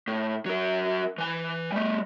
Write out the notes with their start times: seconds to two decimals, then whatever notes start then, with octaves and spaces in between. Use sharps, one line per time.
0.08 A2
0.46 F#3 A#4
1.18 E3 G#5
1.72 G3 A3